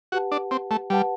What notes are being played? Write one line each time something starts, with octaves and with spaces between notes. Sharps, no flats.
F#4 G4 B4 F#5 A5
D4
C4
A3
G3 G4 B4 F#5 A5